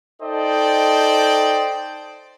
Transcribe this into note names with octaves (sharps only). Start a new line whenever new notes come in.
D#4 A4 C5 D5 D#5 G5